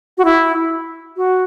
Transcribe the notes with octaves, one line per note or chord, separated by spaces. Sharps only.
F#4
E4
F#4